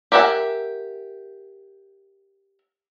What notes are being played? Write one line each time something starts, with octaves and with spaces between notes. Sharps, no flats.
G4 A#4 E5 F#5 G#5